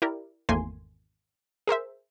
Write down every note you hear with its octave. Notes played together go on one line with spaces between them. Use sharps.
E4 G4 A#4 D5
G#1 E2 A3 A#3 G#5 C6
G#4 A#4 C5 E5